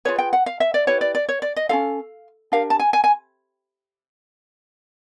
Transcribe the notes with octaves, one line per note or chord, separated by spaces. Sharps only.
F4 G#4 B4 C#5
G5
F#5
F5
E5
D5
E4 G4 B4 C#5
D5
D5
C#5
D5
D#5
C#4 F4 A4 F5
D4 G4 A#4 F5
A5
G#5
G#5
G#5